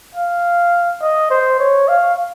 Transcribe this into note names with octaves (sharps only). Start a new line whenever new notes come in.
F5
D#5
C5
C#5
F5